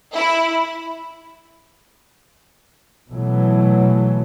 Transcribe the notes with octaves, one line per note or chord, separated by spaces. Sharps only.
E4
B2 E3 F#3 A3